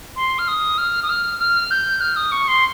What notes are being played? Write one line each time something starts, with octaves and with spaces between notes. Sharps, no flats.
C6
F6
D#6
F6
D#6
F6
F6
G6
F6
D#6
C#6
C6